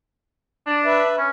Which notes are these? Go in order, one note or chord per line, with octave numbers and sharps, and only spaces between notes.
D4
B4 E5
C#4